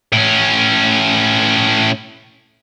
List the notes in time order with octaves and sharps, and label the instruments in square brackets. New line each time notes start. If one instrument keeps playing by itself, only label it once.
[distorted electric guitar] A2 C#4